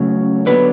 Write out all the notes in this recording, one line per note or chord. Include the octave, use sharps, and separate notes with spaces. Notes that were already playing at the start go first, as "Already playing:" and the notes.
Already playing: C#3 F#3 A3 C#4
D3 F#3 B3 B4